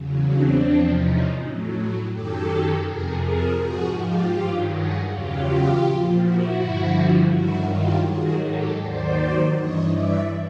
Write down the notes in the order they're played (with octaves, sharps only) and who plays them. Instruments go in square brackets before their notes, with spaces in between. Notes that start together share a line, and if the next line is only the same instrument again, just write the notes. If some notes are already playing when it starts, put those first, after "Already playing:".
Already playing: [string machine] E2 C#3 F#3
C4 D4
E2 C3 F3
C#4 D#4
A2 F#3
F#2 D#3 F#3 G4 A4
F2 C3 F3 G#4 A#4
G#4 A#4
G#2 F3 F#4 G#4
F4 G4
G2 D#3 F#3
F#4 G#4
E2 C#3 F#3 F4 G4
A#2 F3
E4 F#4
G2 D3 F3
G2 D#3 F#3 E4 F#4
F4 G4
G#2 D#3 F#3 F#4 G#4
G4 A4
D#2 D#3 F#3 C5 D5
G2 E3 C#5 D#5
D5 E5